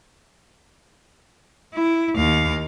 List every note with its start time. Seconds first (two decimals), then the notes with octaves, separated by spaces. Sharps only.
1.75 E4
2.16 D#2 F5